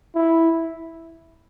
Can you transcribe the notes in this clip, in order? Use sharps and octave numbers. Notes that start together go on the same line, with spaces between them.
E4